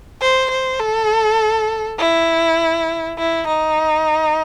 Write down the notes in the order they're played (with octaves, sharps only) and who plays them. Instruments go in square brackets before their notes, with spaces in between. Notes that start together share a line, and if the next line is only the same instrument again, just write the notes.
[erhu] C5
C5
A4
E4
E4
D#4